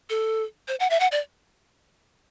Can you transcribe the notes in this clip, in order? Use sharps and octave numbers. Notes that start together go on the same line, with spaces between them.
A4
C5
F#5
E5
F#5
D5